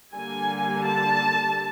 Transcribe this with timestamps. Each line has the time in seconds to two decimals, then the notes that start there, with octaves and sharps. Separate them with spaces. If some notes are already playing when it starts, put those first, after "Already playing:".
0.14 D3 G3 A#3 G#5
0.86 A5